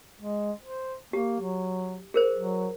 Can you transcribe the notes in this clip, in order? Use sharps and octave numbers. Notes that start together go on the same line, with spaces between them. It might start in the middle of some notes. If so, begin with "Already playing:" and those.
G#3
C5
A#3 G4
F#3
G#4 A#4 C5
F#3